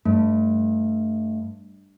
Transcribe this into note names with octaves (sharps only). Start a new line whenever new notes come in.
G2 A3